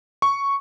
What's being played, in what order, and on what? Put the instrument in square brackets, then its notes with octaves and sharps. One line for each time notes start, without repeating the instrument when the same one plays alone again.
[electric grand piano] C#6